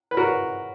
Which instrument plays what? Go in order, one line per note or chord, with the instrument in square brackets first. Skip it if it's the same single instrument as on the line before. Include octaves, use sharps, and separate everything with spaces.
[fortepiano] B4
F#4 A#4